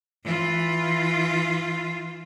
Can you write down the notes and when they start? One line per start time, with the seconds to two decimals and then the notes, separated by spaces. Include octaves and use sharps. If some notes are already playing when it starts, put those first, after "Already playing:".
0.23 E3 F4